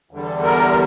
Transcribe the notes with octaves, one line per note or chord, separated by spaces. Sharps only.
E2 D3 G3
A#4